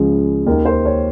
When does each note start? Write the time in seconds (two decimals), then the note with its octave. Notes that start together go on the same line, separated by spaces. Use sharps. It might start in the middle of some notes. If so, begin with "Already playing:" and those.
Already playing: C#2 C#3 F3
0.46 D#2 D#3 A#4
0.65 C5
0.86 C#5